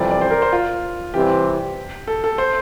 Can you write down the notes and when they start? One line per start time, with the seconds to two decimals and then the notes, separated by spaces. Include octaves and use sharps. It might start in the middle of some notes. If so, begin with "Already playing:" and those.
Already playing: F2 C3 E3 G3 D5
0.11 D5
0.21 C5
0.31 A#4
0.42 C5
0.53 F4
1.14 C3 E3 G3 C4 G4
2.07 A4
2.24 A4
2.38 C5